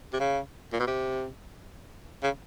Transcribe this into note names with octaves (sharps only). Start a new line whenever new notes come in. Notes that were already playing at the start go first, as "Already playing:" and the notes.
C3
C#3
A#2
B2
C3
C#3